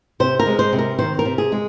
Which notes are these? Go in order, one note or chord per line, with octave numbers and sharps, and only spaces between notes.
C3 C5
A#4
G#3
C5
C3
A#4
D#3 C5
A#4
C3
G#4
G#3